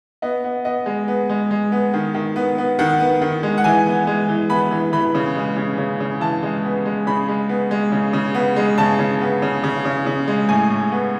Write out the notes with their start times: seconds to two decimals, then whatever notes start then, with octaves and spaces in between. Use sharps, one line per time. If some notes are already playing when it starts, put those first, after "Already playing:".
0.22 B3 D#5
0.44 B3
0.65 B3 D#5
0.86 G#3
1.08 B3
1.29 G#3
1.51 G#3
1.72 B3
1.93 D#3
2.14 D#3
2.36 B3
2.58 B3
2.79 D#3 F#5
3.00 B3
3.22 D#3
3.43 G#3
3.58 F#5
3.64 E3 G#5
3.86 B3
4.07 G#3
4.29 E3
4.50 B3 B5
4.71 E3
4.93 E3 B5
5.15 C#3
5.36 G#3
5.57 C#3
5.78 C#3
6.00 C#3
6.20 E3 A5
6.43 G#3
6.64 B3
6.85 G#3
7.07 C#3 B5
7.28 G#3
7.49 B3
7.71 G#3
7.92 C#3
8.13 C#3
8.34 B3
8.56 G#3
8.78 C#3 A5
8.99 C#3
9.21 B3
9.42 C#3
9.64 C#3
9.85 C#3
10.06 C#3
10.27 G#3
10.49 A2 G#5
10.70 A2
10.92 B3